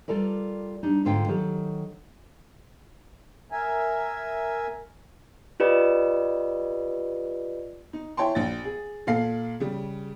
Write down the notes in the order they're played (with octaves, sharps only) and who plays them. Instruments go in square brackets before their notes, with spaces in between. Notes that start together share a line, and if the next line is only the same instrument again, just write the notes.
[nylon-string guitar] G3 F4 A4 A#4 D5
G3 D4 D#4
G#2 D3 F4 F#4 G5
D#3 F#3 G4 A4
[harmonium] A#4 E5 G#5
[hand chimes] F4 G4 B4 D5 D#5
[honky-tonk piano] D#4
E4 C#5 G5 A5 C6
A#1 A6
G#4
A#2 A4 F5 C7
C#3 G3